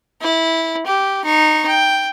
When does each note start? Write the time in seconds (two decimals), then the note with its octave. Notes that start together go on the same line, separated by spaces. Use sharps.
0.21 E4
0.86 G4
1.25 D#4 C#6
1.68 G5